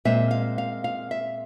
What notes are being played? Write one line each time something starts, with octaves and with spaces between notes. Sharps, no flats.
A#2 G#3 C4 E5
F5
F5
F5
E5